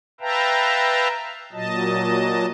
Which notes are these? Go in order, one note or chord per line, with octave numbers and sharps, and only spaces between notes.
B4 E5 F5 G5 A5 A#5
A#2 F#3 D#5 A5